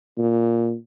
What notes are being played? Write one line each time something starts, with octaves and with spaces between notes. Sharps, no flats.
A#2